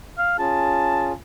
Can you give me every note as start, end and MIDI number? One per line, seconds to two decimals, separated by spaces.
0.18 0.34 77
0.39 1.12 61
0.39 1.12 65
0.39 1.12 68
0.39 1.12 81